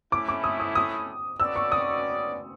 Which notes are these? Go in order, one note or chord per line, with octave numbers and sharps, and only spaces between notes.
A3 C#4 E4 D6
D6
D#6
D#6
D#6
C#4 F#4 B4 D5 E6
C#6
D#6